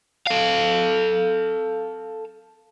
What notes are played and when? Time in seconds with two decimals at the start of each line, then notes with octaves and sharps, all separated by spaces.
0.27 A4 F5